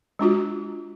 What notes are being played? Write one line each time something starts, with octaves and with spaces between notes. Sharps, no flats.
G#3 D4 F4 F#4